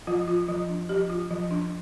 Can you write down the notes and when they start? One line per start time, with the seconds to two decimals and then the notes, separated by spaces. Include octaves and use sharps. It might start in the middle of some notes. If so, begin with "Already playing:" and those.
0.07 F3 F4
0.28 F4
0.48 F3
0.69 D4
0.89 F3 G4
1.10 F4
1.31 F3
1.51 D4